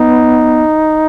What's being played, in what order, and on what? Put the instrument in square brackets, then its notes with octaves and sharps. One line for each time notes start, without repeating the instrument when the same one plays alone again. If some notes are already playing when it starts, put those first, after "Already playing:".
Already playing: [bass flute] B3 [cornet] D#4